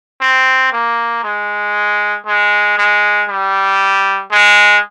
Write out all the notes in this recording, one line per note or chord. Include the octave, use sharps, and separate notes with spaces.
C4
A#3
G#3
G#3
G#3
G3
G#3